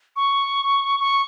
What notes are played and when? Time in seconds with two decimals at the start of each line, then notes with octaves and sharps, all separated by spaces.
0.16 C#6
1.00 C#6